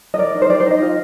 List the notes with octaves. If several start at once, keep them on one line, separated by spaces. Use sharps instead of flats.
D#5
A#4 D5
D#4
C5
G4 D5
C5
D#4
D#5
F4